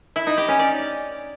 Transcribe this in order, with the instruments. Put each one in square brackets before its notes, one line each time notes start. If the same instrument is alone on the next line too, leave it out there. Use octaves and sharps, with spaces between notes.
[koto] E4
D#4
G4
C#4
D5